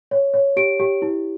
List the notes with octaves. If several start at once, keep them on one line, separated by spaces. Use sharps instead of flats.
C#5
C#5
G4 D7
G4
E4